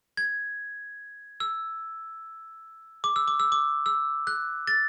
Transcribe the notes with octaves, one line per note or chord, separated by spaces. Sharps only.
G#6
E6
D6
E6
D6
E6
D6
E6
F#6
A6